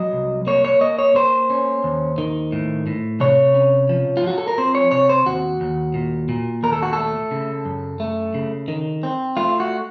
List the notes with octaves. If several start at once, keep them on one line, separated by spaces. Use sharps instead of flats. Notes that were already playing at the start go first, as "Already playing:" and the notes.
Already playing: F#3 D#5
C2
A#3 C#5
C#5
A#3 D#5
C#5
A#3 C5
C#4
D#2
D#3
A2
A2
C3 C#5
C#4
F3
F4
F3 F#4
A4
A#4
C4 C5
C#5
C3 C#5
C5
D#2 F#4
D#2
A#2
A#2
D#2 A#4
A4
F#4
A3 A4
C#3
F#2
A3
C#3
D#3
C4
A3 F4
F#4